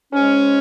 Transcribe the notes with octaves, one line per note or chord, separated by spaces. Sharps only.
G#2 G#3 C#4